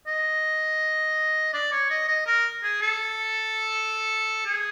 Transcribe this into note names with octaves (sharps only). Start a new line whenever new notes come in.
D#5
D5
C#5
D#5
D#5
A#4
G#4
A4
G#4